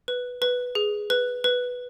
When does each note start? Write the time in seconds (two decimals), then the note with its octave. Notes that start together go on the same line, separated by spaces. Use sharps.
0.08 B4
0.42 B4
0.75 G#4
1.10 B4
1.44 B4